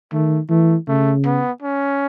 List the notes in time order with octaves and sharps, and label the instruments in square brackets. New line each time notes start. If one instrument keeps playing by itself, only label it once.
[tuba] D#3 [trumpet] A3
[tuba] E3 [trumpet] A3
[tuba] C#3 [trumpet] A3
[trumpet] B3
C#4